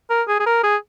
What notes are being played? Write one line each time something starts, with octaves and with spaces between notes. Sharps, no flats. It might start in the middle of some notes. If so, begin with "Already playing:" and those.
A#4
G#4
G#4
A#4
G#4